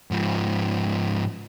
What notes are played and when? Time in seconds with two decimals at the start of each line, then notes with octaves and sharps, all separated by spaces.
0.11 G#2 F3